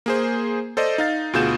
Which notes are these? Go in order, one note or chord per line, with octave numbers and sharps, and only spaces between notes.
A#3 G#4 C5
A4 C5 D5 D#5
D#4 F5 A6
D2 B2 F4 G#4 G6 E7